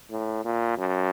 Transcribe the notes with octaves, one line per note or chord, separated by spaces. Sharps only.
A2
A#2
F#2